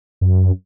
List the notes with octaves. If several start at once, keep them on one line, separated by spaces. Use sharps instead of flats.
F#2